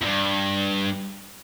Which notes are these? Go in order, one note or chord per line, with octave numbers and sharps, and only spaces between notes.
E2 G2